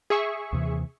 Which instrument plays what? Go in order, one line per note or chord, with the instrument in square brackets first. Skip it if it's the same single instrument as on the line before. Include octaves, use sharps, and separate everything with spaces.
[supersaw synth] G#4 E5 C#6
[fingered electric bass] D#2 C3 E3